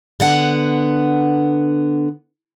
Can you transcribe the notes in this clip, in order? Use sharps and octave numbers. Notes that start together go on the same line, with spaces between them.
D3 B3 F#5